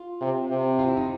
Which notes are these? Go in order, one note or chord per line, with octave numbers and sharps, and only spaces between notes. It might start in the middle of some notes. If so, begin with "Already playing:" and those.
Already playing: F4
C3
C3
F4
E4
D#4